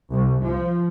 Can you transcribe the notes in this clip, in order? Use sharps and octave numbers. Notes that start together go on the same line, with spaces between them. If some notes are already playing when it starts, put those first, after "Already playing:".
C2
F3